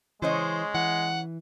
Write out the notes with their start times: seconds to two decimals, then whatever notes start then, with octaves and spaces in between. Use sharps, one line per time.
0.22 C#3 E3 G#3 C5 C#5 D#5
0.74 E3 F#5